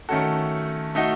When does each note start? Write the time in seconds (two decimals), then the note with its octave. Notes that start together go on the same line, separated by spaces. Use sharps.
0.09 D#3 A3 C#4 F#4 A4
0.95 A3 D#4 F#4